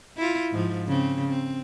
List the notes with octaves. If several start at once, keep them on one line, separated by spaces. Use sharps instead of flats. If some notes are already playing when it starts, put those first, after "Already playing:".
E4 F4
G#2 F3
C#3 C4
C4